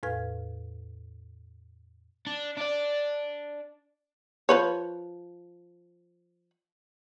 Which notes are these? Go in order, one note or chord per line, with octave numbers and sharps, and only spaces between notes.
E2 A2 B4 F5 F6 G#6
D4
D4 D5
F3 B4 C#5